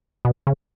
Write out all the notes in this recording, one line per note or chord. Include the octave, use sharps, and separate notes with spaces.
B2
C#3